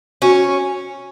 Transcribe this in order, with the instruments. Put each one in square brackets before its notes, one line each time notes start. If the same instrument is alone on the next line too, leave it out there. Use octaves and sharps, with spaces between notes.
[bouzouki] C#4 [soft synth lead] F#4